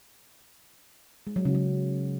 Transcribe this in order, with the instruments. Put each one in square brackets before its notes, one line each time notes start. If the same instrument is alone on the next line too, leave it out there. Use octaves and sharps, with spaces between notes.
[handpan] G#3
F#3
C#3
F#3